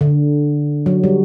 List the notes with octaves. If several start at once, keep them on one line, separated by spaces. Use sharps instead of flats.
D3
F#3
G3